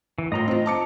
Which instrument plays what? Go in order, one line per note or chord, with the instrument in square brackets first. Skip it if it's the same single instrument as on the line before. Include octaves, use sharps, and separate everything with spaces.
[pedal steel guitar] E3
[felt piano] A2 F4 [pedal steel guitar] D#5 A#5 C6
[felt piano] C4 F4
A5 D6 C#7